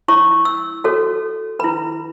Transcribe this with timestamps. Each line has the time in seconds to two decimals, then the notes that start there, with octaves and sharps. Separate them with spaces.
0.08 E4 C#5 C#6
0.45 E6
0.84 F#4 A4 C#5
1.59 E4 B4 B5